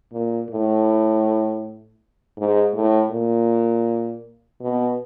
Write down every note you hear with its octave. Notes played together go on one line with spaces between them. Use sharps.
A#2
A2
G#2
A2
A#2
B2